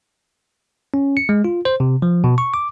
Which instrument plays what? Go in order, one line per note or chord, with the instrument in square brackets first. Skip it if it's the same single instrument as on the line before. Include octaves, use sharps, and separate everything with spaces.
[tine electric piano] C#4
C#7
G#3
F4
C5
C3
F3
B2
C#6
D6